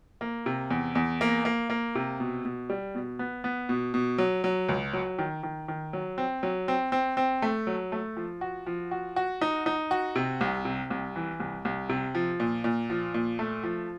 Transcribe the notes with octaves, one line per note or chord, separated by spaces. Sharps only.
A#3
C3
E2
E2
A#3
A#3
A#3
C3
B2
B2
G3
B2
B3
B3
B2
B2
F#3
F#3
C#2
F#3
D#3
D#3
D#3
F#3
C4
F#3
C4
C4
C4
A3
F#3
A3
F3
F#4
F3
F#4
F#4
D#4
D#4
F#4
C3
C2
C3
C2
E3
C2
C2
C3
F3
A#2
A#2
F3
A#2
A3
F3